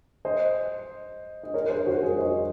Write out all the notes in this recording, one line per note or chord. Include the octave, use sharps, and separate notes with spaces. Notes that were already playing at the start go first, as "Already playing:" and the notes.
C5 D#5
D#5
A#4 C#5
G#4 C5
F#4 A#4
G#4 C5
C5 D#5